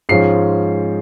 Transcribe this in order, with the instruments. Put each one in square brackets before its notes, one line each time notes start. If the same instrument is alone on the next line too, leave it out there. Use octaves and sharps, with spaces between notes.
[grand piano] G#2 F3 G#3 C#4 F4 C7